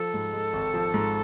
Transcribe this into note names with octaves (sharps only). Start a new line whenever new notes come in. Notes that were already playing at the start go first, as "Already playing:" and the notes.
Already playing: F3 A4
G#2
G#3
G#1
F3
G#2